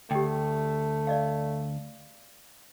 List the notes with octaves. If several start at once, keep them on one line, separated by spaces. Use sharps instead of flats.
D2 A3 G4 G5
D5 D#5 F5